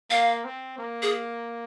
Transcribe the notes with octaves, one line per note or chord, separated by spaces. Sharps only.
A#3 F5
C4
A#3
G#4